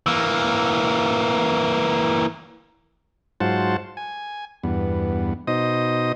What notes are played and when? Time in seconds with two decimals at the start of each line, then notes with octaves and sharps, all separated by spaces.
0.06 E3 A#3
3.40 G#2 F#3 F4 C5 F#5 A5
3.97 G#5
4.63 E2 G2 B3
5.47 B2 D#4 C5 D#5 D#6